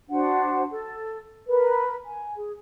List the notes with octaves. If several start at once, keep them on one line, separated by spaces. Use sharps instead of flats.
D4 F#4 C5 F#5
A4
A#4 B4
G#5
G#4